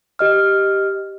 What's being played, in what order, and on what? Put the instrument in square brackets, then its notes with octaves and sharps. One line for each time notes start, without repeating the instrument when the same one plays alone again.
[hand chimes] G4 D#5 F6